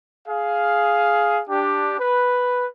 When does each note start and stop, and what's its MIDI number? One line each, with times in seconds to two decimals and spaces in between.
0.28 1.42 68
0.28 1.42 77
1.49 1.98 62
1.49 1.98 67
1.99 2.67 71